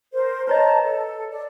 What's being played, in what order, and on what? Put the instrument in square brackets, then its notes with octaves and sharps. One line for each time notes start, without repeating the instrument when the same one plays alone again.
[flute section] A#4 C5
[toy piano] B4 C#5 D#5 [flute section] A5 A#5
[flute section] A4
D5